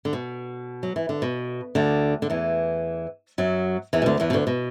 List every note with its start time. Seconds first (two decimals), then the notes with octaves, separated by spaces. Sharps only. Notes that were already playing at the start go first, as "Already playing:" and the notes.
0.05 D3
0.13 B2
0.83 F#3
0.96 E3
1.09 D3
1.22 B2
1.75 D2 D3
2.22 D3
2.30 E2 E3
3.38 F#2 F#3
3.93 E2 E3
4.02 B2
4.06 D2 D3
4.20 E2 E3
4.30 B2
4.33 D2 D3
4.47 B2